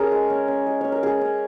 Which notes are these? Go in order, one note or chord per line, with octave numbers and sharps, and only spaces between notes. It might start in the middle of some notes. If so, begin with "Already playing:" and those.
Already playing: C#4 G#4 A#4
G#3
C#4
C#4
G#3
C#4 C#5
A#4
C#4 G#4
C#4